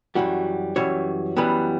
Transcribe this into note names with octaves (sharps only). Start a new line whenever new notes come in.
F#2 E3 G3 F#4
F#2 E3 G3 C#5
F#2 E3 G3 B3 B4